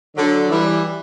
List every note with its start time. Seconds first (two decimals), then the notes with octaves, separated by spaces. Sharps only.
0.16 D3 F#3
0.50 E3 G3